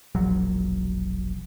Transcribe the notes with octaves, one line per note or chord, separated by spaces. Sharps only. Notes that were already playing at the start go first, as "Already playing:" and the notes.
E1 A#1 F#3